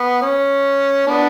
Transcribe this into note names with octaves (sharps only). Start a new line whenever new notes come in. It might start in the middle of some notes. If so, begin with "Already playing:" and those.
Already playing: B3
C#4
B3 D4